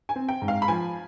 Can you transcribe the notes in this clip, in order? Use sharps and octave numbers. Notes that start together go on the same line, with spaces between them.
G#5
C4
G5
G#2
F5
B5
F3 G#5